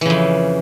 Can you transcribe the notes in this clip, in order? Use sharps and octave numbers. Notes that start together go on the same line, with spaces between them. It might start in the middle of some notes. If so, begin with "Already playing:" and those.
F2 C#3 E3